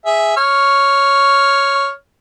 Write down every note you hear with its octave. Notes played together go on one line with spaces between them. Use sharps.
G#4 E5
C#5 F6